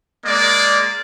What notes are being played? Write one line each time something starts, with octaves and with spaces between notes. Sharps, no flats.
G#3 A#3 D5